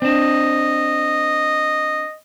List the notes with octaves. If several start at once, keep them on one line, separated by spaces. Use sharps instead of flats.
C4 D4 D#5